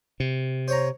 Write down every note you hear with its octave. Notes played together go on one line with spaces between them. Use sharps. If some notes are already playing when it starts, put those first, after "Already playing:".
C3
C5 C#5 A#5